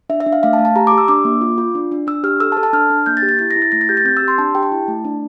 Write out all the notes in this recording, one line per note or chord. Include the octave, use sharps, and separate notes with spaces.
D4 E5
E5
D4
F5
A3 F5
A5
A3
A5
G4 A#5
D6
G4
E6
D4 D6
A#3
F4
F4
D4
D4
D4 E6
G4 F6
A4 E6
A5
A4
A5
D4 F6
D4
A#3 G6
A6
G4
A6
E4 A6
A#6
E4
A6
A3 A#6
A6
G4 G6
A6
C4 G6
E6
G4
C6
D4 A5
G4 G5
A5
E4
A3
D4